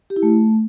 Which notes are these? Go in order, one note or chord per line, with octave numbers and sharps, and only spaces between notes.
G4
E4
A3